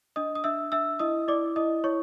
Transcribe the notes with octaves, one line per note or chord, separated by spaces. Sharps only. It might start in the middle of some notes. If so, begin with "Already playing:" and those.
D4 D#5 D#6
D#6
D4 E5 E6
D4 E5 E6
E4 D#5 D#6
E4 D5 D6
E4 D#5 D#6
E4 C#5 C#6